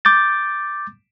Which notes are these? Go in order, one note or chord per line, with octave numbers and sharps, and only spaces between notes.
D6 G6 A6